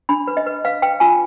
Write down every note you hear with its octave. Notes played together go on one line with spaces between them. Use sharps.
D4 B5
B4
D#5
B4
B4 F5
B4 G5
F4 G#5